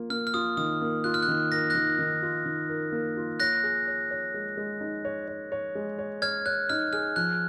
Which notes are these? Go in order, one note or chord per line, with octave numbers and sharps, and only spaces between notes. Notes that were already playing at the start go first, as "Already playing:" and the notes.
Already playing: A#3 F4
A#3 F6
F6
F4 D#6
D#3 D#6
A#3
F4 F#6
F6
F#6
D#3
A#4 A#6
D#3 F#6 A#6
D#3
F4
D#3
A#4
A#3
F4
C#5 F#6 A#6
G#4
C#5
C#5
G#3
G#3
D#4
C#5
C#5
C#5
G#3
C#5
C#5 F6 G#6
C#5 F#6
D#4 F6
G#4 F6
F3 F#6